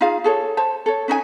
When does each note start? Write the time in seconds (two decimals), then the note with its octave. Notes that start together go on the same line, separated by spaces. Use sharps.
0.01 D#4 F4 G#4 F5
0.24 G#4 A4 C#5
0.57 C5 A5
0.86 A4 C#5
1.08 C#4 D#4 B4 G#5